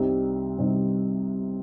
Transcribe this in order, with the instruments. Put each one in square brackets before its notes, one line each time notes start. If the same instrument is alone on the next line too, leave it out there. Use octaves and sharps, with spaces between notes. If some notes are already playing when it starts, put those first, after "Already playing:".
Already playing: [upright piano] C2 C3 G3 C4 D#4
C2 C3 G3 C4 D#4